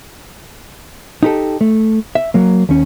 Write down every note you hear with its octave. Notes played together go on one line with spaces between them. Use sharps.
D#4 G4 A4
A3
E5
F#3 A#3
D#2 C#4